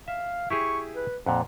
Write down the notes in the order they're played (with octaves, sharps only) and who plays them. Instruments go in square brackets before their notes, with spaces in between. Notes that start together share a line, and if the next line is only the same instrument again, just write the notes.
[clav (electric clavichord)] E5 [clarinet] F5
[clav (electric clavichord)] E4 G4 G#4 [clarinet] C#6
[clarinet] B4
[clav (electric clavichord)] F2 A#2 [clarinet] F#5